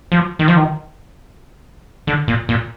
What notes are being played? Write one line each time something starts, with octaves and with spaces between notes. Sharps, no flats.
F3
D#3
F3
D#3
D3
A#2
A#2